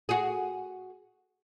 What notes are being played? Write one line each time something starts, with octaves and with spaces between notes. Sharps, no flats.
F#4 G#4